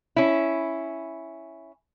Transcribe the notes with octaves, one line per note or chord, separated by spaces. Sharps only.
C#4 E4